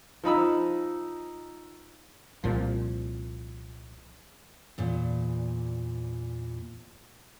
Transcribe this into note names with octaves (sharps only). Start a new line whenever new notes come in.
F3 D#4 B5 E6
C2 A#2 F3
E2 A#2